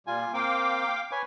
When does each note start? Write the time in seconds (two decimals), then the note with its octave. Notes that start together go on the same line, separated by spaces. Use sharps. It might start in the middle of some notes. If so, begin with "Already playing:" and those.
0.07 A#2 G3 F4 G#5
0.34 A#3 C4 F5 G5 D6
1.11 B4 C#5 G#5